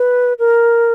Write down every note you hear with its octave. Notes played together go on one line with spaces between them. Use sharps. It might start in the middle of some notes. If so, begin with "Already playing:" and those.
Already playing: B4
A#4